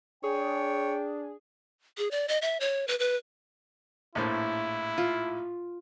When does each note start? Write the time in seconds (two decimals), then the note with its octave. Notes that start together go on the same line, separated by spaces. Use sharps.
0.24 D4 G#4 C#5 G5
1.98 G#4
2.11 D5
2.28 D#5
2.42 E5
2.60 C#5
2.88 B4
2.99 B4
4.15 A#1 A2 E4 C5
4.98 F4